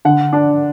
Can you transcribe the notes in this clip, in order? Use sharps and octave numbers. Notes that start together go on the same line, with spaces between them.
D3 F#5
D4